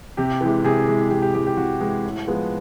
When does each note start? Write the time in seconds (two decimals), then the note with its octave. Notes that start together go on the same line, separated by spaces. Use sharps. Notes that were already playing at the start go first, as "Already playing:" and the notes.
0.17 C3 G4
0.41 E3 G#3
0.64 C3 G#4
0.88 E3 G#3
1.11 C3 G4
1.22 G4
1.34 E3 G#3 G4
1.47 G4
1.57 C3 F#4
1.80 E3 G#3
2.05 A2
2.27 F3 G#3 B3